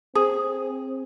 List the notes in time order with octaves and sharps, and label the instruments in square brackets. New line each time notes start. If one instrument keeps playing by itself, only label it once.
[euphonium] C4 [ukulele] G#4